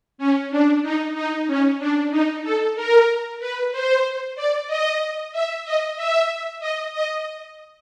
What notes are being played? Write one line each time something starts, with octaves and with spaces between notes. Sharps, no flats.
C#4
D4
D#4
D#4
C#4
D4
D#4
A4
A#4
B4
C5
D5
D#5
E5
D#5
E5
D#5
D#5